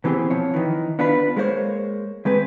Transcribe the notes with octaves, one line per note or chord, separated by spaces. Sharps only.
B2 E3 B3 C4 G4 G#4
F3 C#5
D#3 E3
B3 D4 F4 B4
G#3 A#3 C#4 C5 C#5
D#2 G#3 C4 B4